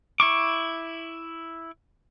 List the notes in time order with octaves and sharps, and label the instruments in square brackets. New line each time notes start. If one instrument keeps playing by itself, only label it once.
[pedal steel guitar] E4 C#6 D6